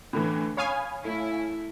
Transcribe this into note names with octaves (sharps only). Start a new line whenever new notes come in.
A2 D3 E3
C#5 F5 G#5 B5 D#6
A3 E4